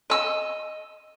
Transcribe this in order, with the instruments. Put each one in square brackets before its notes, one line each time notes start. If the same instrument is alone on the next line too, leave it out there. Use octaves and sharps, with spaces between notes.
[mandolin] D#5 E6